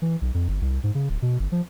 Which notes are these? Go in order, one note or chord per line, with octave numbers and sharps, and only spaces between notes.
E3
B1
F2
G1
C2
G#2
C#3
D1
B2
G1
F3